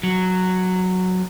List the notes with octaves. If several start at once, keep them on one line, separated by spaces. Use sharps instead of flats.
F#3